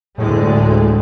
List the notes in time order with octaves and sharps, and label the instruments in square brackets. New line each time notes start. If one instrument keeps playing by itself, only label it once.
[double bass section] D2 D3 G#3 [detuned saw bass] A2